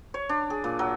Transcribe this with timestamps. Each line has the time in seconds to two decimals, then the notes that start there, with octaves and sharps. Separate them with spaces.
0.14 C#5
0.29 D4
0.50 G#4
0.64 A#2
0.79 F#3